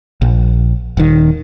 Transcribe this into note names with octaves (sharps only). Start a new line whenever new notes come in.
A#1
D#1 D#3